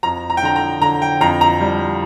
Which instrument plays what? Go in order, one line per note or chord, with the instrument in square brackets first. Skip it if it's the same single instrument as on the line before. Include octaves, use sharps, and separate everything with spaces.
[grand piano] F2 A#5
A#5
G5
D3 A#5
A#5
D3 A#5
G5
F2 A#5
A#5
G3